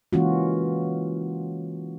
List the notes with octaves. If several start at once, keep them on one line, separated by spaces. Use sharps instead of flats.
E3 G#3 A#3 C#4 F4 F#4